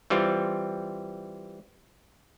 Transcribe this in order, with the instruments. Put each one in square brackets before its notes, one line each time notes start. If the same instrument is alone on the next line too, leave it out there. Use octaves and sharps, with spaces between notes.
[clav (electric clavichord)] E3 G3 C4 F4